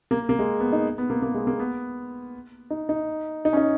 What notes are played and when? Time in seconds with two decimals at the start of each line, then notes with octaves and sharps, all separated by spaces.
0.11 A#3
0.29 A#3
0.39 G#3
0.60 B3
0.73 D#4
0.98 B3
1.10 A#3
1.22 A#3
1.34 G#3
1.47 A#3
1.59 B3
2.70 D#4
2.89 D#4
3.45 D#4
3.53 C#4
3.57 D#4